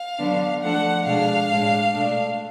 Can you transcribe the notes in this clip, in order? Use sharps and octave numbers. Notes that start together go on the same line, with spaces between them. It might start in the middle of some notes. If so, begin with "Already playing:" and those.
Already playing: F5
D3 F#3 B3 D4
F3 A3 D4 F#5
B2 G#3 D4 F5
A2 G#3 D4
B2 A3 D4